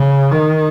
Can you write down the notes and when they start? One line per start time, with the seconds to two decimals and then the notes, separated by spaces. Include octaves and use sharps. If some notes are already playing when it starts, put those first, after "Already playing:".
Already playing: C#3
0.32 D#3